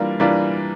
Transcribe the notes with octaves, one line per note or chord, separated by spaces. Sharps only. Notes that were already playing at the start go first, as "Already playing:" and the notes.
Already playing: E3 G3 A#3 D4 F4
E3 G3 A#3 D4 F4